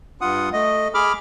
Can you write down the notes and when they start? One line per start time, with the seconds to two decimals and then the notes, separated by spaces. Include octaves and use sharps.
0.21 G2 F4 F#5 D#6
0.53 A3 D#5
0.94 G#4 B5 D6 F6